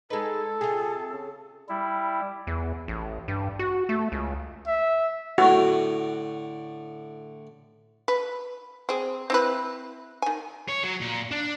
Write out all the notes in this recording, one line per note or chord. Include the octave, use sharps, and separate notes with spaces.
G#3 D#4 A4 B4
C3 F4 G#4
C#3
G3 E4
E2
A1
G2
F#4
A3
C#2
E5
A2 D3 F#4
B4
C4 G#4
C4 E4 B4
D#3 G#5
C#5
F#3
A#2
D4